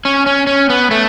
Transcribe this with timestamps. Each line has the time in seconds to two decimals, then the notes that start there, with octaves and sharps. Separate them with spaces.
0.05 C#4
0.26 C#4
0.47 C#4
0.70 B3
0.91 A3